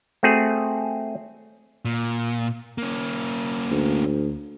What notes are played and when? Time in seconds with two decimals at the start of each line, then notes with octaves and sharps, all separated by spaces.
0.23 A3 C4 F#4 G#4
1.85 A#2
2.78 A#3 C#4
3.71 D2